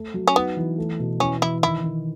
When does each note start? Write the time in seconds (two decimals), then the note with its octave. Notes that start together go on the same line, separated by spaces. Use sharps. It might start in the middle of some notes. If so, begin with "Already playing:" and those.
Already playing: A3
0.14 F#3
0.28 C#4
0.36 B3 D#4
0.57 E3
0.78 A3
0.99 B2
1.20 E3 C#4
1.42 E3 E4
1.63 D#3 E4
1.84 D#3